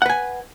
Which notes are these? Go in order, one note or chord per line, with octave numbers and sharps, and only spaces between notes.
B4 F#5 G#5